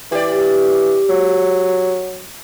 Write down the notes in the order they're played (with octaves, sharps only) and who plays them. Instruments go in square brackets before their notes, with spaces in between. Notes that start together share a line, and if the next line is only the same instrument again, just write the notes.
[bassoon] E3 [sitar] G4 D5
[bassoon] F#3